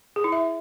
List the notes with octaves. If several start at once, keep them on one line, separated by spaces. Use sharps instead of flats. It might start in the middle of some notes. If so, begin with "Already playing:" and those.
G#4
E4
E5